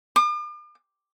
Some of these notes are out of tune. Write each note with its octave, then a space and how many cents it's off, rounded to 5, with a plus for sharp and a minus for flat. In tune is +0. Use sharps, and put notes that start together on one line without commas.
D6 +45